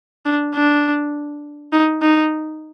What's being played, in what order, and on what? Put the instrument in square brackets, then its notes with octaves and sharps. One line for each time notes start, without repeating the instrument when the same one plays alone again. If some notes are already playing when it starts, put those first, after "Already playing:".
[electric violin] D4
D4
D#4
D#4